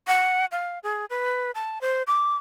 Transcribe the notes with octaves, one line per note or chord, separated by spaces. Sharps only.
F#5
F5
G#4
B4
A5
C5
D6